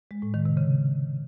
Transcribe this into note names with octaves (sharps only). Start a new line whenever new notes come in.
G#3
A2
D#3
C3
C#3